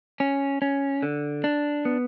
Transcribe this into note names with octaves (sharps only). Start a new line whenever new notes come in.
C#4
C#4
D3
D4
B3